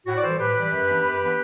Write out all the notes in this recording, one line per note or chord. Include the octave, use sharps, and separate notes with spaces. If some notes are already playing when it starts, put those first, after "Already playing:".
A2 F#4
D5
E3 G3 A4 C5
A2 G4 B4
E3 G3
F#2
E3 B3 D4
F#2
E3 B3 D4